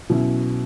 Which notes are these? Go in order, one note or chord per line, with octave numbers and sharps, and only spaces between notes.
B2 F#3 C#4 E4